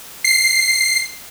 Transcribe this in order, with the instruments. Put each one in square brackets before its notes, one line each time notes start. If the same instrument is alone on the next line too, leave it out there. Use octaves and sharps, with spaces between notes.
[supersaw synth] C7